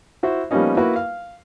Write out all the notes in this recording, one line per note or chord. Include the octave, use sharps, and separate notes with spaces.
E4 F#4 C5 E5
F3 G3 A#3 B3 C#4 D#4
A#3 E4 F#4 B4
F5